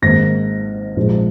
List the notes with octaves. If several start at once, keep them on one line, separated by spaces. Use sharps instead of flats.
G#1 G#2 D#3 A#3 A#6
A#1 G#2 F3 G#3